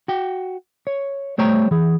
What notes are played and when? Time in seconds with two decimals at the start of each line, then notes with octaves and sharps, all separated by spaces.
0.08 F#4 G5
0.87 C#5
1.38 G3 A3 C5 C#5 G5 A#5
1.71 E3 G#4